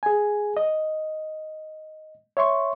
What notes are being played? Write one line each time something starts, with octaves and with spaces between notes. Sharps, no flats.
G#4 G#5
D#5
C#5 E5 C6 C#6